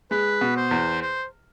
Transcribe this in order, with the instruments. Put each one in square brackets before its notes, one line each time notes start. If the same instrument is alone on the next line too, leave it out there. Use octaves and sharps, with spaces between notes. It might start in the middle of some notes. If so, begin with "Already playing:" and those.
[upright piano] G#3 [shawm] B4
[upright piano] B2
[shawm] C5
[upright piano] E2
[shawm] C5